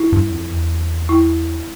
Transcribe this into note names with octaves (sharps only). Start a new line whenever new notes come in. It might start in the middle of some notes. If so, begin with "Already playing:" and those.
Already playing: E4
G2
F2
E2
E4